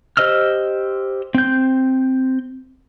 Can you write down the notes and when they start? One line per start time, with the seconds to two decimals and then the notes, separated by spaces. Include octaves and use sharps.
0.17 G4 C5 D#5 E6 F6
1.35 C4 G6